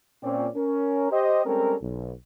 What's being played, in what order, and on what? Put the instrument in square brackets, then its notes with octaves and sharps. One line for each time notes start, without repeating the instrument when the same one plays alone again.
[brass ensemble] A#2 C4 C#4 D5
C#4 A#4
G4 C5 D#5
G3 G#3 C4 C#4 A4 A#4
B1